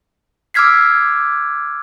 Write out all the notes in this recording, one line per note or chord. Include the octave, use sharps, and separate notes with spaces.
D6 E6 F6 G#6 B6 C7